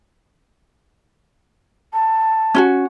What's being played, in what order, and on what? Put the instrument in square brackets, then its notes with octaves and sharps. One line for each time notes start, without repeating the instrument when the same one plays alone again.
[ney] A5
[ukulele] C#4 F4 F#4